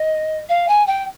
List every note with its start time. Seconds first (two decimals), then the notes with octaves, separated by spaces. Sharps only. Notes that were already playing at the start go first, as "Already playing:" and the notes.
Already playing: D#5
0.49 F5
0.68 G#5
0.87 G5